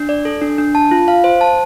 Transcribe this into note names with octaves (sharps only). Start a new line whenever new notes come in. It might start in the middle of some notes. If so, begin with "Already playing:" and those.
Already playing: D4
D5
A4
D4
D4
A5
F4
F5
C5
A5